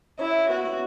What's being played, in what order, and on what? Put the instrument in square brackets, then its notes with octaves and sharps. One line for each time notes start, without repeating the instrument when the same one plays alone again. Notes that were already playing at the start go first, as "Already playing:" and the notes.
[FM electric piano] C#4 C#5 [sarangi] E4
[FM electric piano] B3 B4 [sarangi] F#4
[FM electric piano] B3 B4